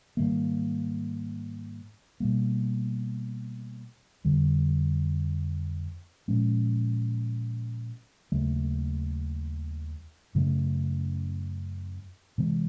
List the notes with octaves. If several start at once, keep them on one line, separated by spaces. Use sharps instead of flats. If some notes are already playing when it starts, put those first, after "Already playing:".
G#2 D#3 G3 A#3
B2 G3 A#3
F2 D3 G3
A#2 F3 G#3 C#4
D#2 C#3 F#3 A3
F#2 C#3 F#3 A3
C3 E3 G#3 C4